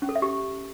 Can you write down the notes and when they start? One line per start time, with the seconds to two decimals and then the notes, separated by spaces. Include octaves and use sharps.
0.02 C#4
0.09 A4
0.16 E5
0.22 G4